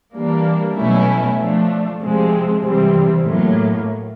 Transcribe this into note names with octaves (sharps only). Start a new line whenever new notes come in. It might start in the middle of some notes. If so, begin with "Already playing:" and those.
E3 G3 A#3 D4
B2 F#3 A3 C#4 E4
F3 A3 D4
C3 F3 G#3 C4
C3 E3 G3 C4
A2 F#3 A#3